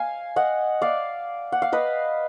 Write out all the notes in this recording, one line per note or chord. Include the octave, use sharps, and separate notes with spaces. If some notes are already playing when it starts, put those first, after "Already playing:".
Already playing: F5 G#5
D#5 F#5
D5 F5
F#5
F5
B4 D#5